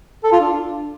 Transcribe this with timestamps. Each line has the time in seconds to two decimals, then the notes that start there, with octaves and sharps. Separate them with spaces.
0.24 A4
0.32 F4
0.40 D4